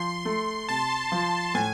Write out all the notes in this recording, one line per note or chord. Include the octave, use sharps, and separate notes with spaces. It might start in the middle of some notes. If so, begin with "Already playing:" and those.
Already playing: F3 C6
A3
C3 A5
F3
A2 G#5